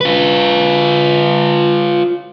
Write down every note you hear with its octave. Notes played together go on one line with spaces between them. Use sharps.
F4 B4